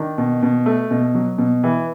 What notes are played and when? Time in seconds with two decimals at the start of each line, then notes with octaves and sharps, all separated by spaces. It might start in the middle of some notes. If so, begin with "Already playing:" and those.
Already playing: D#3 D4
0.18 B2
0.43 B2
0.66 A3
0.91 B2
1.15 F#3
1.38 B2
1.64 E3